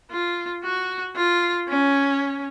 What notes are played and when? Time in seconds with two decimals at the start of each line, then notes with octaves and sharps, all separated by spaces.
0.11 F4
0.63 F#4
1.16 F4
1.68 C#4